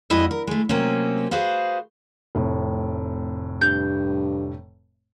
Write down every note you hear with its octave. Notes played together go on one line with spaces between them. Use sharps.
F2 G#3 E4 F#4 D#5
A#4
G#3 A3
C3 F#3 A#3 C4 C#4
F#4 G#4 B4 C5 F5
F1 A2 C3
G2 G6